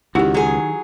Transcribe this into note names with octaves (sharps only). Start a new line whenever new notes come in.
C#2 D#3 D#4 E4 F#4 G4
F#3 G#4